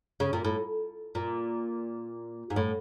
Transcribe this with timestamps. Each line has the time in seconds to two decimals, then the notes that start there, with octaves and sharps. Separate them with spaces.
0.20 C#3
0.33 A#2
0.45 A2
1.15 A#2
2.50 G#2
2.56 A2